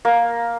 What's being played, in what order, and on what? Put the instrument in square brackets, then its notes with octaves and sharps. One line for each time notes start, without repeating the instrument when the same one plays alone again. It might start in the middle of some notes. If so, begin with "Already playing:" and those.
[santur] A#3